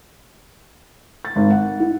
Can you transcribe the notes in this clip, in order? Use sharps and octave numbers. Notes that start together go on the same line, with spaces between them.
A6
G#1
F#5
E4